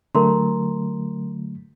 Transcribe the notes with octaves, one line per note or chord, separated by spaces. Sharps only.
D3 F#3 A3 A#4 A#5 C6